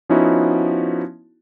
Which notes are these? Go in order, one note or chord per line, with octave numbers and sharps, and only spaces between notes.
F3 B3 C#4 D#4 E4 F#4